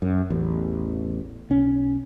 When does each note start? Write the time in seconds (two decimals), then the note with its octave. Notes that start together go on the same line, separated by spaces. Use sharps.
0.02 F#2
0.30 A1 E2
1.50 B1 C#4